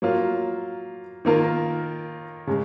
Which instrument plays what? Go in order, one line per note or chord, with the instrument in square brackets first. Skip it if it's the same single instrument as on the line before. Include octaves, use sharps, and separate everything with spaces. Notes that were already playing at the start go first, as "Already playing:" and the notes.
[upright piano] F#3 A#3 F4
D#3 A#3 F4 A#4
C#3 G#3